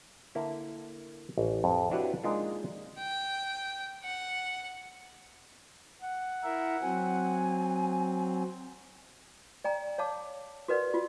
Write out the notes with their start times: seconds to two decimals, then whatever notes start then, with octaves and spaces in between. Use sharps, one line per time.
0.35 D3 A#3 E4
1.38 A1
1.64 F2
1.91 D4 E4 F#4 G4 B4 C#5
2.24 G#3 A#3 D4 D#4 F4
2.99 G5
4.03 F#5
6.02 F#5
6.44 E4 A#4 E5
6.82 F#3 C4 G#5
9.64 D5 G5 A#5
9.98 C#5 F5 A5 D6
10.68 F#4 A#4 B4 D5 F#5
10.94 F4 F#4